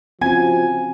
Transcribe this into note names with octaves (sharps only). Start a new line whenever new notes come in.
F3 C4 C#4 F#4 G#5